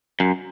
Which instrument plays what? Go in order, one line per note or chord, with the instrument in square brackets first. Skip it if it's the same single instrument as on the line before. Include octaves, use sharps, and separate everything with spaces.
[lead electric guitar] F#2